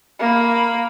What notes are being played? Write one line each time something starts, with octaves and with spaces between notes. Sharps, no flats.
A#3 B5